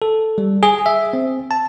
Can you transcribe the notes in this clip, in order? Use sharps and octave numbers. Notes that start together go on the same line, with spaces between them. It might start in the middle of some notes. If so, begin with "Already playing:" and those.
A4
G3
G#4
E5
C4
A5